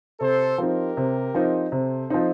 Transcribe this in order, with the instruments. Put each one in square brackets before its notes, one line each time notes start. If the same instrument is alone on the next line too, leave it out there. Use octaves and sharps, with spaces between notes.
[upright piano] C3 [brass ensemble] A4 C5
[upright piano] F3 C4 D#4 [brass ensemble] G4 A#4
[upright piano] C3
F3 C4 D#4
[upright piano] C3 [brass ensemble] A4 C5
[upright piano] F3 C4 D#4